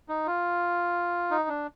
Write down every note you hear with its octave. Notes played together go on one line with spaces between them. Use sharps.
D#4
F4
D#4
D4